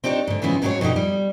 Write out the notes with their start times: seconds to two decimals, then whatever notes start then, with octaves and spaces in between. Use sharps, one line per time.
0.04 C4 D4 D#4 G4 C#5
0.27 G#2 D3
0.42 C#3 E3 F3 G#3 B3 E4
0.62 G#2 F#3 C4 G4 G#4 C#5
0.81 B2 D3 F3 D#4 G4
0.96 G3